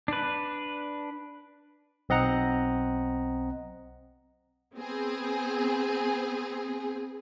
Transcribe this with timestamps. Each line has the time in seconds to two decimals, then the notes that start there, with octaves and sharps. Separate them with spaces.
0.08 D4 B4
2.09 B1 C4 D#5 F#5 A#5
4.76 B3 C4 G#4